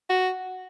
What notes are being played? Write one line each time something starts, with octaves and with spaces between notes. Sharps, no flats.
F#4